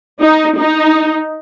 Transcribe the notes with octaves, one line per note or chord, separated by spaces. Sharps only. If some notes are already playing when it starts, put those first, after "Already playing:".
D#4
D#4